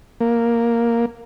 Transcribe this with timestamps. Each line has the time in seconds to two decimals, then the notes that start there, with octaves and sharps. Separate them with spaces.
0.21 A#3